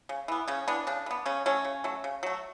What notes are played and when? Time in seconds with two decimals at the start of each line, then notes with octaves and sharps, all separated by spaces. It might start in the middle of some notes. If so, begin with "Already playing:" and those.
0.09 C#3
0.28 E3 B3
0.48 C#3 C#4
0.68 E3 B3 D4
0.87 C#3 D4
1.06 E3
1.11 B3
1.26 C#3 C#4
1.46 F#3 A3 C#4
1.65 C#3
1.84 F#3 A3
2.04 C#3
2.23 F#3 A3